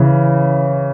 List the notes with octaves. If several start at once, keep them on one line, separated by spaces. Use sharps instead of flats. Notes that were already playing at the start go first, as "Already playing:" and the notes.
Already playing: C#3 E3